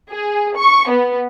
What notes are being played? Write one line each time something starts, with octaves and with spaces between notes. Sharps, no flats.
G#4
C#6
B3